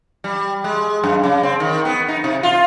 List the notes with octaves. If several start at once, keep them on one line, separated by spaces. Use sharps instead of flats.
G3
G#3
F#2
C#3
C4
D#3
B3
D#4
C3
F4